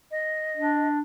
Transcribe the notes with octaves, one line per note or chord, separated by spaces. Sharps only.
D#5
D4